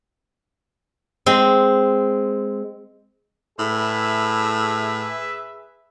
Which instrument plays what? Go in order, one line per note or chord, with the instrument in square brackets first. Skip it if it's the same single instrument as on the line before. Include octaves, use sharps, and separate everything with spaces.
[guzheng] G#3 C4
[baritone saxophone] A2 [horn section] G#4 B4 E5